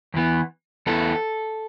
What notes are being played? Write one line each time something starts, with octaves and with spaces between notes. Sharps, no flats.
E2 E3 B3
E2 E3 B3 A4